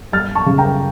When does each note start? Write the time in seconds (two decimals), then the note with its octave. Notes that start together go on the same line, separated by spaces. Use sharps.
0.12 G3 F6 A6
0.35 A5 C#6
0.46 C#3
0.58 G5 A#5